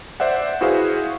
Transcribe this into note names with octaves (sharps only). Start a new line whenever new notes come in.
C5 D5 E5 F#5
E4 F#4 G#4 B4 C5 F5